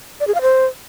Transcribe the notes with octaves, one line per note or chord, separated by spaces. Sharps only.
D5
G#4
F5
C5